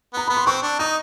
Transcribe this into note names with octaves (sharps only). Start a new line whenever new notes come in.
B3 A#5
B3 B5
C6
C4 C#6
D4
D#4 D#6